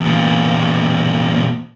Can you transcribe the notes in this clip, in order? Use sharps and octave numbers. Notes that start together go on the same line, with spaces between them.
E2 A#2